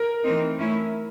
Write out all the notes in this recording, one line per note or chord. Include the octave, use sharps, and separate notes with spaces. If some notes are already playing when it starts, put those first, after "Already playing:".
Already playing: A#4
E3 A3 C4 D#4
A3 C#4 E4